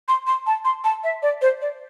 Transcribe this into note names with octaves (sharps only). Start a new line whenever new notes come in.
C6
C6
A5
C6
A5
E5
D5
C5
D5